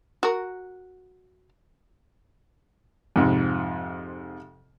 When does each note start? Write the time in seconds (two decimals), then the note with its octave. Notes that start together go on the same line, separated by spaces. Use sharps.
0.23 F#4 A#4
3.16 F2 G#2 C3